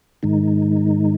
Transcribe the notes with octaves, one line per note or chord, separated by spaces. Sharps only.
G#2 D#3 G#3 D#4